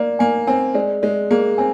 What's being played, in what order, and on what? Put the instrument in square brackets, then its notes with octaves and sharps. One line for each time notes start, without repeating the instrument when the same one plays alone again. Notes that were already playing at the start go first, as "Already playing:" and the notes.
Already playing: [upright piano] A#3 [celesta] D5
[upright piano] A#3 [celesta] G#5
[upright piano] C4 [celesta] G#5
[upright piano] G#3 [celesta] D5
[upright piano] G#3 [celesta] D5
[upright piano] A#3 [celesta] G#4
[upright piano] C4 [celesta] G#5